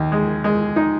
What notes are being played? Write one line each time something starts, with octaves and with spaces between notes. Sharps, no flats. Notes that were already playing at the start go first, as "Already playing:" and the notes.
Already playing: D#2
G#3
G#3
D#4